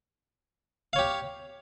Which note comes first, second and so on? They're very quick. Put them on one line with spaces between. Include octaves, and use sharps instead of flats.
F5 C#5 G4